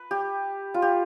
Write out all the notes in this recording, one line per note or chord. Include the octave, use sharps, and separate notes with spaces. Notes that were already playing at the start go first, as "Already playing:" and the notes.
Already playing: B4
G4
F4
G4